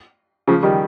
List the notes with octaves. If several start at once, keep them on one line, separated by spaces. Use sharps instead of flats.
C#3 F3
D#3 G3